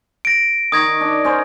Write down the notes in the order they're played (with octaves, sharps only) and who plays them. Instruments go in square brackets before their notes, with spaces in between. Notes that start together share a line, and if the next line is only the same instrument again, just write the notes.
[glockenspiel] A#6 D7
[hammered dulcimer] D#3 C#6 [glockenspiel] D#6 G#6 A#6
[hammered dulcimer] D4
C#4 A#4 C5